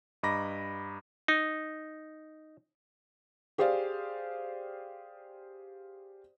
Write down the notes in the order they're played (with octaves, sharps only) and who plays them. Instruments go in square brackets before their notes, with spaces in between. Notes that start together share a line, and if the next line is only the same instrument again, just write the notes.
[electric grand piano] G2 D#5 A#5 B5 D6 A#6
[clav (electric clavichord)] D#4
[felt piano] G4 G#4 C5 D5 F5